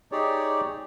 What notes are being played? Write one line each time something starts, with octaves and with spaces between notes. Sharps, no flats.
D#4 G4 G#4 C#5 D5